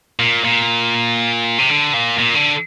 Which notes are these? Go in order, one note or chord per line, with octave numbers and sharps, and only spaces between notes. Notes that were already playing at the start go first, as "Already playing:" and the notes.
A#2
A#2
C3
D3
A#2
A#2
D3